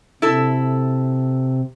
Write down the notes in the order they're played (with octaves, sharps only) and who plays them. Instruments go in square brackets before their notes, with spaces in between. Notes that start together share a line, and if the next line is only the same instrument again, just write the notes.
[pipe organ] C3 [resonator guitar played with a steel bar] E4 A4